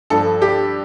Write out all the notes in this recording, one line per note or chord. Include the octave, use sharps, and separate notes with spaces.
G2 F3 A4
G4